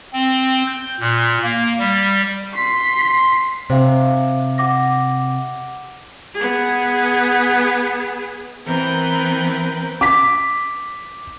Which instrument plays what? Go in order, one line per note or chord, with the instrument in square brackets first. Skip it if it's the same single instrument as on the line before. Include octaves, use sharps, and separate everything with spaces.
[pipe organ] C4
G6
A#2
A#3
G3
[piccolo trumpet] C6 [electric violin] B6 C7
[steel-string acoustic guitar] C3 [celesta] C5 F5
[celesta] F#5 D6 A#6
[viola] B3 G#4
[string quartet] E3 B3 C4 A#4 B4 G6
[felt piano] D6 B6